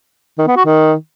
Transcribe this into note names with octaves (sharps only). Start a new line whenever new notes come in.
D#3
B3
F#4
D#3